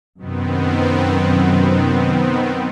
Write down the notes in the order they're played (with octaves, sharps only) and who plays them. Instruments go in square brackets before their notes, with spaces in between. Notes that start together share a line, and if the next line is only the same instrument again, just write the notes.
[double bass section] F#2 C3 F#3 [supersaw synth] D#3 B3 C4